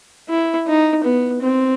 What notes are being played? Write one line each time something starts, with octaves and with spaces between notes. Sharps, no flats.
E4
D#4
B3
C4